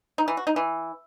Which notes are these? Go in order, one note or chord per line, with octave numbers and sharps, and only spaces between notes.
D#4
E3
F#4
D#4
E3